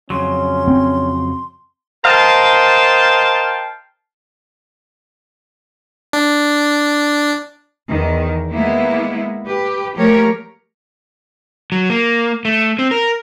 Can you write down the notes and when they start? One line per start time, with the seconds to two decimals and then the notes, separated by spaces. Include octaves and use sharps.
0.10 F2 C#3 F#3 C#4 C6
0.68 C4
2.05 A#4 C5 D#5 F5 G5 A5
6.13 D4
7.90 E2 D#3
8.52 G#3 A#3 B3 E4
9.46 G4 B4
9.95 F3 A3 A#3 G4 A#4 C#5
11.72 F#3
11.90 A#3
12.45 A3
12.79 C4
12.91 A#4